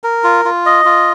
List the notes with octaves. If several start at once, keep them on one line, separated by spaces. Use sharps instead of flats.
A#4
F4
F4
D#5
F4